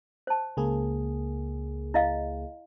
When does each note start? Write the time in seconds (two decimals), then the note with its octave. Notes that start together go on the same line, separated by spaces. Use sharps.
0.27 C5 A5
0.57 C#2 A#3 G#4
1.94 E4 D#5 F5